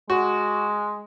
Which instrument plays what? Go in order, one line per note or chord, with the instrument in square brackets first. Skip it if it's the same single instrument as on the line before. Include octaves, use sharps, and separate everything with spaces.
[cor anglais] G#3 [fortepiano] F#4